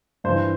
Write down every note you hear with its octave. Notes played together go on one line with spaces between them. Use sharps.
G2 E3 C5